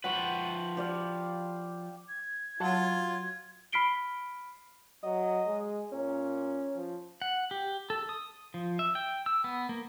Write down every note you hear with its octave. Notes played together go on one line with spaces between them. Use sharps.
F3 B4 F#5 G5 C#6
G4 D5 F5
G#6
F#3 F4 F#5 A5
B5 F6 B6 C7 D7 G7
F#3 D#5
G#3
A#2 C#4
F3
F#5
G4
A4
D#6
F3
E5
G5
E6
B3
A#3